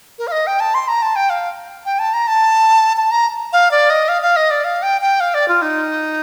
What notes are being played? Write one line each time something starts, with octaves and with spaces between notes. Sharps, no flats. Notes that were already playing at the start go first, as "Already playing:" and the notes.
A#4
F5
D#5
G5
A5
C6
A#5
A5
G5
F5
G5
A5
A#5
A5
A5
A#5
F5
D5
D#5
F5
F5
D#5
D5
F5
G5
G5
F5
D5
F4
D#4